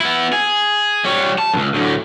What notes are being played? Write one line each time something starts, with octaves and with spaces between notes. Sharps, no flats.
B3 E4
G#4
G3 C#5
A5
C#2 F#2
D2 A2